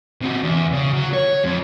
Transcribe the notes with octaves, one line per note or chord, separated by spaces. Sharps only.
C3 F#4
E2
C#3
F#3
C#5
F2